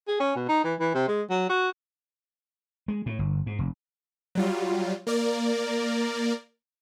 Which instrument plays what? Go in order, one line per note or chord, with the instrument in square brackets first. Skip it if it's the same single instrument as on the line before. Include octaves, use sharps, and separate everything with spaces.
[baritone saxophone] G#4
C#4
B2
D#4
E3
E3
C3
G#3
F#3
F#4
[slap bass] G#3
A2
G1
G#2
F1
[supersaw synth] F#3 G3 F4
A#3 A#4 D5